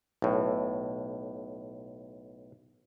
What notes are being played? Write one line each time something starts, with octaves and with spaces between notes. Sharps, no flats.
B1 A2